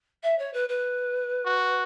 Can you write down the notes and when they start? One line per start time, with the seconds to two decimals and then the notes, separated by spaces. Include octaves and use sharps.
0.23 E5
0.38 C#5
0.53 B4
0.69 B4
1.46 F#4